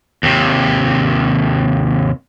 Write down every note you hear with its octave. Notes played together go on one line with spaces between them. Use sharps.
D#2 C3